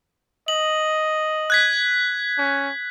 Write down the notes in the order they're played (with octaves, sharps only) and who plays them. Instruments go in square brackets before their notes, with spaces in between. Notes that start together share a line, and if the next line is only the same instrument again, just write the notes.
[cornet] D#5 [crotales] F#7
[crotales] F#6 G#6 B6
[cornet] C#4